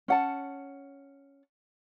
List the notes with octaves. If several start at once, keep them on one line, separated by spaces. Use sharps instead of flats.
C#4 F#5 A5